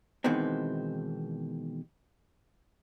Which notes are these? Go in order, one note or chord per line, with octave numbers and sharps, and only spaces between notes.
B2 D#3 E3 G#3 B3 C4